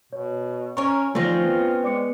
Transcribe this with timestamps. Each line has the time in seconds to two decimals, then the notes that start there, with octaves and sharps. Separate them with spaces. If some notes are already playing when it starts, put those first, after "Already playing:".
0.13 B2 C#5
0.77 C#4 A#4 C#5 C#6
1.15 D#3 F3 A3 C4 C#4 F4 D5 A#6
1.42 B3
1.84 G#3 D5 D6 C#7